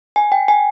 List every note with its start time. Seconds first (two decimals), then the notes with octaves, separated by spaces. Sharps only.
0.16 G#5
0.32 G5
0.48 G#5